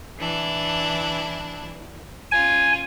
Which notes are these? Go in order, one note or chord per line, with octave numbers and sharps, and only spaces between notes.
E3 D4 E4
C#4 F4 G#5